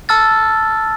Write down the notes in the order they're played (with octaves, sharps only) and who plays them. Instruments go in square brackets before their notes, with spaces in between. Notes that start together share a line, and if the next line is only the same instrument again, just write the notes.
[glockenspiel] A5 E6 F6 A6